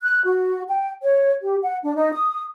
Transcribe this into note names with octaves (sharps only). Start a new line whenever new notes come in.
F#6
F#4
G5
C#5
G4
F#5
D4
D#4
D#6